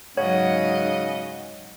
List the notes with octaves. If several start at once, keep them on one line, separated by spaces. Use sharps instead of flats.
G#2 C#3 F#3 C#5 D#5 F#5